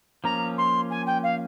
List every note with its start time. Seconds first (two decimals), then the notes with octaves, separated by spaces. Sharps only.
0.24 F3 A#3 C#4 A#5
0.57 C6
0.90 G#5
1.06 G5
1.23 F5